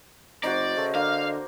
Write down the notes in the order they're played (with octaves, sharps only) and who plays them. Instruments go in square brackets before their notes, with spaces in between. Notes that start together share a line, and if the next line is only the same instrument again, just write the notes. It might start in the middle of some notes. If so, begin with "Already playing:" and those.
[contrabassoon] F#1 [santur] F#4 C5 A#5 [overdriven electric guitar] D5 [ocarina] D#5
[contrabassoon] C#3 [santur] A3
[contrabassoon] D3 [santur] A#3 [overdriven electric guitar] F5